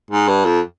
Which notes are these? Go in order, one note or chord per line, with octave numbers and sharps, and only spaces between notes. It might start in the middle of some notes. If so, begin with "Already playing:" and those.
G#2
G2
F2